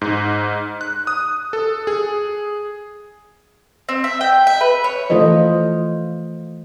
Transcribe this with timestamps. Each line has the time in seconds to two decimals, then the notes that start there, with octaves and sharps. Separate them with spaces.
0.01 G#2
0.81 F#6
1.07 D#6
1.53 A4
1.87 G#4
3.89 C4
4.04 E5
4.21 G5
4.47 E5
4.61 B4
4.84 C#5
5.10 E3 A3 F4 A4 C5 D#5